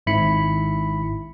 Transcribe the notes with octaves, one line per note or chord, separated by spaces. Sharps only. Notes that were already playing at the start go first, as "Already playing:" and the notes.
G#1 G#2 E4 B5 C#7